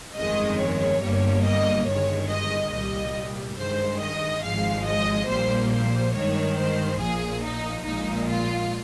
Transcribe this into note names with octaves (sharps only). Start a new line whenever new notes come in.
G1 F2 D#3 G#3 D#5
C#5
G1 G2 G3 A#3
D#5
G1 G2 D#3 G#3 C#5
D#5
C2 A#2 G3 D#5
G2 D#3 G#3 C5
D#5
G#1 G#2 F3 G#3 F5
D#5
A#1 A#2 G3 A#3 C5
C5
G2 D#3 G#3 C#5
C5
A#1 A#2 F3 G#4
D#4
A#1 A#2 G#3 D#4
F4